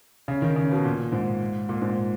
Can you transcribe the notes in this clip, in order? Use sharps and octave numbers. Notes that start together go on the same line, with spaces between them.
C#3
D#3
C#3
B2
A#2
G#2
A#2
G#2